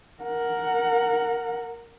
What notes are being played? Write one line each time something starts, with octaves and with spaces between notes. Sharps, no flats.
A#4 F#5